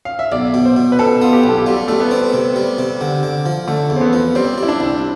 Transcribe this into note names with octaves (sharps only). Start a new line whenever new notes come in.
F5
E5
B1 D5
B2
C5
B2
B4
B2 A4
B3 F4
G4
B1 A4
G4
G3 F4
G3 A3
B3
C4
C3
G3
C3
D3
D3
F3
D3 A3
E2
C4
B3
F3
G3 C4
G3 E4
D4
C2